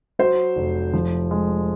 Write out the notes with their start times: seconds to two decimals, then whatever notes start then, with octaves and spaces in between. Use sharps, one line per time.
0.19 F#3 C5
0.56 F1
0.94 F3
1.31 G#3